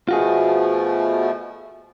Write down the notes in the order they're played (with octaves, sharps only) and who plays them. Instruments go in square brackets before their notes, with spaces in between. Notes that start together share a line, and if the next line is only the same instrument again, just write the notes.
[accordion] B2 F3 A3 [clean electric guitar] F4 F#4 G#4